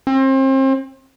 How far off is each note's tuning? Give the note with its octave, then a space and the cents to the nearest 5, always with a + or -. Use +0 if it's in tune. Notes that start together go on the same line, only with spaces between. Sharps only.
C4 +35